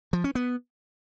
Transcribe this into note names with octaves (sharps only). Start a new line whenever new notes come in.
F3
C#4
B3